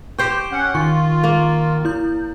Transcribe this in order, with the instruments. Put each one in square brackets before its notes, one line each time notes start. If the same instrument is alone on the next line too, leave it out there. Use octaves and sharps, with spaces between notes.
[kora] G4 C5 G5 [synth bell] C#6 G6
[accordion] C#4 F#5
[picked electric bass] D#3 [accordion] F4 [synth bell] C#6
[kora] A#3
[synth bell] E4 G6